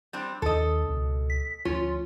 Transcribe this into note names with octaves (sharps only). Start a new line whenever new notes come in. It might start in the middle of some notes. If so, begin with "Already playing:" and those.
G3 C4 D4
D#2 D4 A4 D#5
C#2 B2
B6
D2 F3 C#4 F4